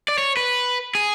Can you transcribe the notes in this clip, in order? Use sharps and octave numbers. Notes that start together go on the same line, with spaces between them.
D5
C#5
B4
G#4